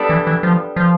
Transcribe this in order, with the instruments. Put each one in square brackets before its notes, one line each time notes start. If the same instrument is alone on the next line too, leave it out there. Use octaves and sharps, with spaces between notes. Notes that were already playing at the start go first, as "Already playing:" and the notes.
Already playing: [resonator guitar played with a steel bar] G3 B3 D4 A4 D5
[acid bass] E3
E3
F3
F3